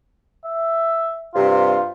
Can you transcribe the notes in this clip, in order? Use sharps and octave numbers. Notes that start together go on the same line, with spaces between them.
E5
G2 C3 F4